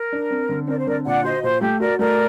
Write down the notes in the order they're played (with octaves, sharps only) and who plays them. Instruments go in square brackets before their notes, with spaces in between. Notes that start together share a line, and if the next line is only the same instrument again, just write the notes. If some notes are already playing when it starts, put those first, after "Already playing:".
Already playing: [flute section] A#4
[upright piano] D4
C4
D3
[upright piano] C4 [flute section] A#4 D5
[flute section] C5
[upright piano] D3 [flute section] A#4 D5
[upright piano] A#2 [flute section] D5 F#5
[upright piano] F#4 [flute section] C5 D#5
[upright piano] A#2 [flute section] C5
[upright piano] A3 [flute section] G4
[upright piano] F#4 [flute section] A#4 D5
[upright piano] A3 [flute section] A#4 D5